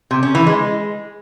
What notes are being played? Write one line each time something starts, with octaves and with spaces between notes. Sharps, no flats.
C3
C#4
E3
G#3